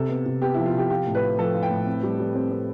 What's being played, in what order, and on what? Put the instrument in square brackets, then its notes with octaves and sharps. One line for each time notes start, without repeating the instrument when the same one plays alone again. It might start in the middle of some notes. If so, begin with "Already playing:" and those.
Already playing: [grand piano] C3 [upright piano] A4
[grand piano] B3
C3
[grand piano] B3 [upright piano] G4
[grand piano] F3 [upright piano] E4
[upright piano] F4
[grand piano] C3 [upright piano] G4
[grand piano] F4 [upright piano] G4
[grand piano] A2
[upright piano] B4
[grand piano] F4
[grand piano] F3 [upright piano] A4
[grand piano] F4
[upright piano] G5
[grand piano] A2
C4
G3
G3
C4
C4